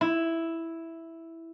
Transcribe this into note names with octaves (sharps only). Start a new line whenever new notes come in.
E4